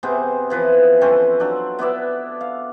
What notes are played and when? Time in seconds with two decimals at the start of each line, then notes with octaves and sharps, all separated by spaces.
0.03 C3 B3 G#4 C5
0.50 E3 F3 B4
1.01 C4 C#4 A4 B4
1.40 F#3 D4
1.79 B3 E4 D5 E5
2.41 F5